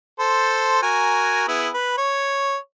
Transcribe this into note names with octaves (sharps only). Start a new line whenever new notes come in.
A4 C5 C6
F#4 A#4 G#5
B3 E4 G#4
B4
C#5